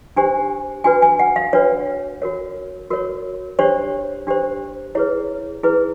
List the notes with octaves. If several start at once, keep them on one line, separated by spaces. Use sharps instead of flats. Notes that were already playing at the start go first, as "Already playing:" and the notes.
D4 G4 C5 G#5
D4 F#4 B4 G#5
G#5
F#5
F5
D4 F#4 B4 C#5
F#4 A#4 C#5
F#4 A#4 C#5
D4 G4 C5 C#5
D4 G4 C5
E4 G#4 B4 C#5
E4 G#4 B4